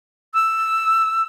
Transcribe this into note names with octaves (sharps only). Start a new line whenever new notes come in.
E6